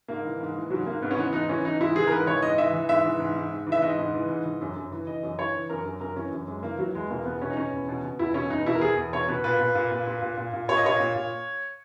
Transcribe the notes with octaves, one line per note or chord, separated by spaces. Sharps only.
G#2 A#3
E3
G#2
E3
G#2 F#3
G#2 A#3
G#2 B3
C#4
E3 B3
G#2 D#4
E3 C#4
E3 D#4
G#2 E4
E3 G#4
A#4
G#2 B4
E3 C#5
G#2 D#5
E3 E5
E3
G#2 E5
E3
G#2
G#2
G#2
E3
E5
G#2 D#5
G#2
E3
G#2
E3
F#2
F#2
E3
E3 D#5
F#2
E3 C#5
E3
F#2 A#4
F#2
F#2 A#4
E3 C#4
F#2
F#2 G#3
E3 A#3
E3 F#3
E2 G#3
B2 A#3
E2 B3
B2 C#4
D#4
B2 C#4
E2
B2
B2
E2 E4
B2 C#4
E2 D#4
B2 E4
A#4
E2 G#4
E2
B2 C#5
B2 B4
A#2 B4
A#2
A#2
A#2
A#2
A#2
A#2
A#2
A#2 C#5
D#5
A#2 C#5
A#2
A#2